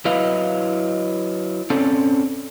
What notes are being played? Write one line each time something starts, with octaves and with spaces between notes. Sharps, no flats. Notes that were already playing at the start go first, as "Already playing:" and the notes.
F#3 E4 B4 D#5 F5
C4 C#4 A4 D5